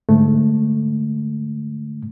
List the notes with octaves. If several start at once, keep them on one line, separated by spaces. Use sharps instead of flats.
G#2 D3 A3